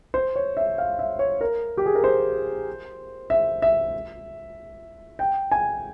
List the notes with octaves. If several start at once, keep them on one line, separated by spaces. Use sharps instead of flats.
C5
C#5
E5
F5
E5
C#5
A#4
G4
G#4
A#4
C5
E5
E5
G5
G#5